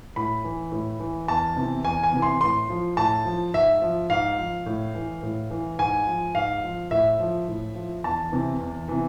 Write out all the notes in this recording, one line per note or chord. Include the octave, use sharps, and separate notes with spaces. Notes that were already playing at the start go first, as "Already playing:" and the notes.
A2 B5
E3
A2
E3
E2 A5
C3 E3
E2 G#5
G#5
C3 E3
C6
A2 C6
F3
A2 A5
F3
G#2 E5
F3
G#2 F5
F3
A2
E3
A2
E3
G#2 G#5
F3
G#2 F5
F3
A2 E5
F3
A2
F3
E2 A5
C3 E3
E2
C3 E3